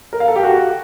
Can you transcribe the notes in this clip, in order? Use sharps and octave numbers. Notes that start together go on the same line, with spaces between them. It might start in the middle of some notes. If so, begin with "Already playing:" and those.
A#4
F5
A4
G4
F#4